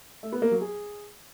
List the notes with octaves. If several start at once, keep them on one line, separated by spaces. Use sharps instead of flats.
A3
B3
A#3
F#3
G#4